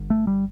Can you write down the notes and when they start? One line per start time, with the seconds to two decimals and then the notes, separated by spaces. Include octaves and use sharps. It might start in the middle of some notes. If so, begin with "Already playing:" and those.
Already playing: G1 G2 D3
0.10 A3
0.27 G3